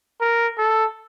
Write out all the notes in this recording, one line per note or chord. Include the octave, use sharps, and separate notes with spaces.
A#4
A4